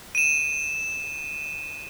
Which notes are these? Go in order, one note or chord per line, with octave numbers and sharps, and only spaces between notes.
D#7 E7